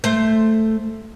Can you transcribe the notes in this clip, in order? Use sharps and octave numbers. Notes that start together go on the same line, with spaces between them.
A3 C5